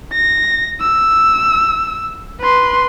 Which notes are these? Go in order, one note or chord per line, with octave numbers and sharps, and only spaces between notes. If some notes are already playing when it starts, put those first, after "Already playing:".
A#6
E6
B4 C6